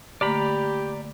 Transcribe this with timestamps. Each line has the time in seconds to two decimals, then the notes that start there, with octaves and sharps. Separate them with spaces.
0.21 D3 A3 A#3 G4 D5 A#5 B5